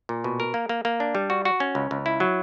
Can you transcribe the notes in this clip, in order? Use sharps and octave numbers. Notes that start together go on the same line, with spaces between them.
A#2
B2
A#4
A#3
A#3
A#3
D4
G3
F#4
F#4
C#4
C#2
C#2
E4
F#3